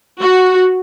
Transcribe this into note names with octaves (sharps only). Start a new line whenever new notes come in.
F#4